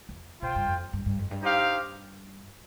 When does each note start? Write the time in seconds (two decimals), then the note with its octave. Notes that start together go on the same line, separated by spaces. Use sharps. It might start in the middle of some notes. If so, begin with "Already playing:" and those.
0.09 F2
0.42 A#2 F4 C5 G5
0.56 G2
0.67 F2
0.93 G2
1.06 G2
1.19 F2
1.31 G2
1.43 D#4 G4 C5 F5